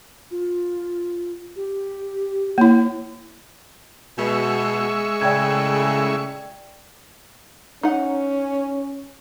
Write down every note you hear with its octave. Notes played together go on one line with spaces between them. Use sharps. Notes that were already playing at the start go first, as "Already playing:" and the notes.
F4
G4
A#3 E4 C#5
B2 G#3 E5 C#6
A2 C#3 D5 G5 G#6
C#4 D#4 F#5